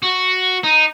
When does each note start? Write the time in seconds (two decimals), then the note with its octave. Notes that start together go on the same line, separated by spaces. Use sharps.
0.03 F#4
0.63 D#4